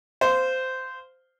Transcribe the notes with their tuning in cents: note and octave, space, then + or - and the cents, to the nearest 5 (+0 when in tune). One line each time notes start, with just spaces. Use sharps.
C5 -15 F5 +0